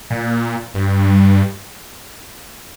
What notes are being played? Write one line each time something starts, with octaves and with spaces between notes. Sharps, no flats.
A#2
G2